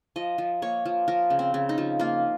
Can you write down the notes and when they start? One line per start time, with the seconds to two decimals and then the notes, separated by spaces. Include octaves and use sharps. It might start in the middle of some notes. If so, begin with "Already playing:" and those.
0.16 F3 D#5
0.38 F3
0.62 A#3 C#5
0.86 F3
1.08 F3 A#4
1.30 C#3
1.39 C4
1.54 C#3
1.69 D#4
1.78 F3
2.00 A#3 F4